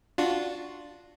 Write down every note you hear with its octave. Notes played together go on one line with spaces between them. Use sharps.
D4 F4 F#4